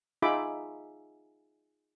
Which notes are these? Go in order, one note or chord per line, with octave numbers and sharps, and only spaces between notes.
D#4 F4 G#4 E5 B5 D6